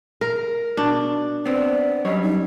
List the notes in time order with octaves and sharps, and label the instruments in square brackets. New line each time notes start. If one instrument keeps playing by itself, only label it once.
[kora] A#4
[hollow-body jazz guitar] B2 [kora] D4
[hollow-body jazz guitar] B3 C4 [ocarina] D5
[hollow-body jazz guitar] F#2 G3 C#5 [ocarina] D#5
[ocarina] D#4